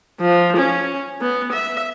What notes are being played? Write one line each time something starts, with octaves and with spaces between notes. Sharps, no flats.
F3
C#4
B3
E5